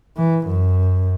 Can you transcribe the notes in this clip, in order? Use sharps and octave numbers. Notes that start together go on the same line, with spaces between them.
E3
F#2